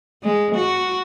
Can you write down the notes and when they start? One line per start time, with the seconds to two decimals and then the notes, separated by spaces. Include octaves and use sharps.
0.23 G#3
0.55 F#4